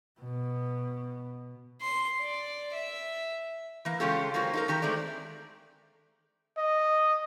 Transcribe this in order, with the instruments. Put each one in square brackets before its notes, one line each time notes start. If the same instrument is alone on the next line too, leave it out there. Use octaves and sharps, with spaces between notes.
[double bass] B2
[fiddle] C6
D5
E5
[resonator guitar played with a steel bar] E3 A#3
C#3 G#3 C#4 F4 G4 A4
F#3 A#3 C4 F4
D#4 A4 A#4
D#3 G4 A#5
G#3 A3 C4 D5
[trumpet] D#5